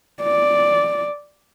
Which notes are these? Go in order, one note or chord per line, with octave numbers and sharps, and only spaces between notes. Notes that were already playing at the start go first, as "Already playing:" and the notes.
D5